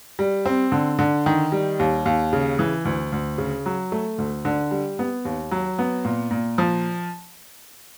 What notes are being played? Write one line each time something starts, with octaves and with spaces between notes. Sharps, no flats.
G3
C4
D3
D3
D#3
G3
D#2
D#2
C#3
E3
D2
D2
C#3
F#3
A3
D2
D3
G3
B3
D#2
F#3
B3
A#2
A#2
F3